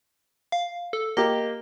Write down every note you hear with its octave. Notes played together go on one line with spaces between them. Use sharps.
F5
A4
A#3 G4 D#5